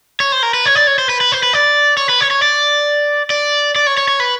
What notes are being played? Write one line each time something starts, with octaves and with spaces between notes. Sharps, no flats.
C#5
C5
A#4
B4
C#5
D5
C#5
C5
B4
B4
C5
B4
D5
C#5
B4
C#5
C#5
D5
D5
D5
C#5
C#5
C#5
B4